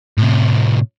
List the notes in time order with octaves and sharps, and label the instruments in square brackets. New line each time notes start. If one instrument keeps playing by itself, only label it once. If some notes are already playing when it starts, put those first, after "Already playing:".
[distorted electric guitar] A2 C3